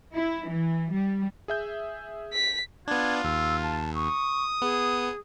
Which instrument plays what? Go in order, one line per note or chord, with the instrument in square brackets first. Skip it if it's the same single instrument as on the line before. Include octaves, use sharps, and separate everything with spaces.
[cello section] E4
E3
G3
[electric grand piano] G#4 E5 G6
[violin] B6
[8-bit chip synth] B3 D4 [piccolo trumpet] F4 [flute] G#6
[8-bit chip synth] D#2 [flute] E6
[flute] A5
[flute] C#6 [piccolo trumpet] D#6
[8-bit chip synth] B3 [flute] G#4